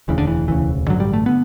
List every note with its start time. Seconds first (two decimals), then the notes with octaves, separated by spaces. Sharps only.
0.08 E1 D2 C#3 E3
0.18 D3
0.27 E3
0.47 E1 D2 C#3 E3
0.87 A1 G2 D3 F#3
1.00 G3
1.13 A3
1.26 D3 B3